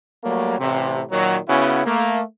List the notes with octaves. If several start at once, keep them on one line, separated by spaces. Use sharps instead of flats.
F#3 G3 A3 A#3
A1 A2 C3
A#2 D#3 F#3
C#3 B3 C#4 E4 F#4
A3 A#3